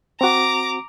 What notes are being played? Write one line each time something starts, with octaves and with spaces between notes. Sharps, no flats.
C4 F#4 A#5 D6